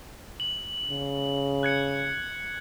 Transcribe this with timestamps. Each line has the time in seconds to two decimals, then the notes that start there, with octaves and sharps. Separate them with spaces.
0.40 F#7
0.90 C#3
1.63 F#6 G#6 C#7